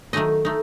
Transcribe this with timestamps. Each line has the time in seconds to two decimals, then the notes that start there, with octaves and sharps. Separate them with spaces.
0.13 D#3 F#3 A3 D#4 D#5
0.45 A3 D#4